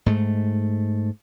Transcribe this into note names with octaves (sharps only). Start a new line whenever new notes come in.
G#2 A3